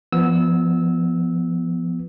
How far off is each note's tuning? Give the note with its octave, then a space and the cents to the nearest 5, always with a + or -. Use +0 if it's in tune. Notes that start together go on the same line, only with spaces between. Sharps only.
F3 -20 B3 +0 E6 -20